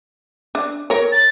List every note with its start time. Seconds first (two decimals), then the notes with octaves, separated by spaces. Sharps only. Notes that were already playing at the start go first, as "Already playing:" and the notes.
0.55 D4
0.90 A#4 C#5
1.12 A6